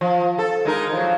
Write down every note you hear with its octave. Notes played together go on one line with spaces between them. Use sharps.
F3
A4
G#3 D#4 A#4
F3 F#3